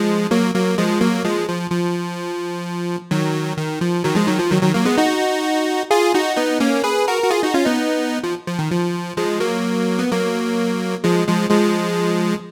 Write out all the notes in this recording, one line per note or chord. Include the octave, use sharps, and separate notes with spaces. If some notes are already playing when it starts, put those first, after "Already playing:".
Already playing: F3 G#3
F#3 A#3
F#3 A#3
F3 G#3
F#3 A#3
F3 G#3
F3
F3
D#3 F#3
D#3
F3
D#3 F#3
F3 G#3
D#3 F#3
F3
D#3 F#3
D#3 F#3
F#3 A#3
G#3 B3
D#4 F#4
F4 G#4
D#4 F#4
B3 D#4
A#3 C#4
G#4 B4
F#4 A#4
F#4
F4 G#4
D#4 F#4
C#4 F4
B3 D#4
F3
F3
D#3
F3
F3 G#3
F#3 A#3
B3
F#3 A#3
F3 G#3
F3 G#3
F3 G#3